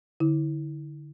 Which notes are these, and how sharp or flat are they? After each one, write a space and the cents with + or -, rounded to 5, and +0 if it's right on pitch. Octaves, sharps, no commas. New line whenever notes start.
D3 +5 E4 -30